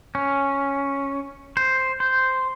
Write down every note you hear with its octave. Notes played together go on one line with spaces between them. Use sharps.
C#4
C5
C5